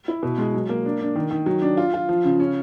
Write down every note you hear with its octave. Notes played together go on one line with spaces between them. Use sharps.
E4
B2
G#3
F#3
A#3
D4
D4
D#3
D#3
F#3
D4
F4
F4
F3
C#3
C#4